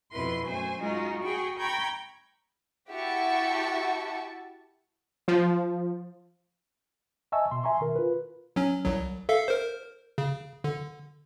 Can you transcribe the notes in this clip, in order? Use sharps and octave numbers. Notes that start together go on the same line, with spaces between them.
F2 B2 E4 B4 C6
F#2 A3 C5 G#5
G#3 D#4 F4 F#4
F#4 G#4 G5 B5 C#6
G5 A#5 B5 C#6 G6 G#6
E4 F#4 G4 E5 A5 C#6
F3
D#5 E5 G#5 A5 C#6 E6
B2 C6
E5 G#5 A#5 C6 C#6
B2 D#3 A#4
F4 B4
F#3 C#4
C2 F#3
A4 E5 F5
A#4 C5
C#3
D3